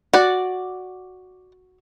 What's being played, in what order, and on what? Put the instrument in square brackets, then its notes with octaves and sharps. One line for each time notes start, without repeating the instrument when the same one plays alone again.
[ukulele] F#4 [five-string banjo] D5 F#5